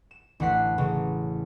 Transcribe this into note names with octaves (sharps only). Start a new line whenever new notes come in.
E7
A1 D3 F#5 B6 C7
A1 C#3